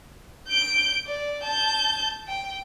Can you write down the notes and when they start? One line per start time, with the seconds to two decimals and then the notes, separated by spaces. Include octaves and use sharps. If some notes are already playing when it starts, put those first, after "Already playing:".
0.48 G6 D7
1.07 D5
1.44 A5 G6
2.28 G5